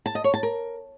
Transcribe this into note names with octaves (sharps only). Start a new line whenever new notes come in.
A5
D#5
C#5
A5
A#4